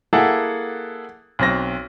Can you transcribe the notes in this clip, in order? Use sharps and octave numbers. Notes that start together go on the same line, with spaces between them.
A#3 E4 G#4 A4 F#5
B1 C4 A#6